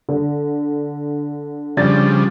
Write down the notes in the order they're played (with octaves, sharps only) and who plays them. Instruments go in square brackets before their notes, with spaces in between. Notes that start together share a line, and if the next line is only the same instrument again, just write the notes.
[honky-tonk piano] D3
[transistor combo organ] C#3 F3 G3 [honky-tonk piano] D4 A6